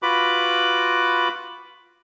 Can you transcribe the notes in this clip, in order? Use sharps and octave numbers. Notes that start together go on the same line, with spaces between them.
F4 F#4 B4 B5 D6